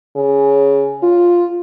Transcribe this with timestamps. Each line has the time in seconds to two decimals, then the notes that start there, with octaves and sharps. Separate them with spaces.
0.16 C#3
1.03 F4